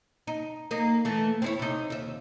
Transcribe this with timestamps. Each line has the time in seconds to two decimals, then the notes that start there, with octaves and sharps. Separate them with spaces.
0.27 D#4
0.71 A#3 D#4
1.05 E3 A3
1.42 C4 E4 C#5
1.59 C3 D#4
1.90 D#2 E5